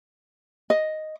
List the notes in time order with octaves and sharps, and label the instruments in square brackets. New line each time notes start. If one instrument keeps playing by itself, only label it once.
[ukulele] D#5